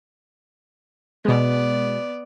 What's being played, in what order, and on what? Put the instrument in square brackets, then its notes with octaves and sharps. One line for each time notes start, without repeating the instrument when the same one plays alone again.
[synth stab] B2 G#3 [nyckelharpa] B3 D5